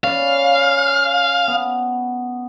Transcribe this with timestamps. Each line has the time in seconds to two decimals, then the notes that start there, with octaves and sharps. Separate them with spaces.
0.04 C#4 B4 D5 F5
1.47 B3